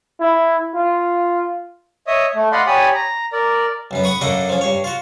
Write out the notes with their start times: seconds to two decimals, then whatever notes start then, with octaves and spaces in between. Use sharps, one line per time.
0.20 E4
0.74 F4
2.07 C#5 D#5 E5 D#6
2.35 A3
2.52 D5 D#5 F5 F#5 B5 C6
2.67 G4 C#5 D5 G#5 B5 D#6
2.95 A#5
3.33 A#4 D5
3.91 B1 F#2 B3
4.04 F#5 B5 C#6 D#6
4.21 F#2 A#3 D4 A4 D#5 F#5
4.49 F3 C#4
4.61 G2 C#5
4.84 F4 F#4